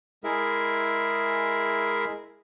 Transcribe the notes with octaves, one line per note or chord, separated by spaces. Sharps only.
G#3 E4 G#4 A#4 E5